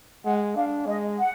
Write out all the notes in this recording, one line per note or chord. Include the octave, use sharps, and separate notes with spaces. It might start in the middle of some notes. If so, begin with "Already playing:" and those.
G#3 F#5
D4 F5
G#3 D#5
F#5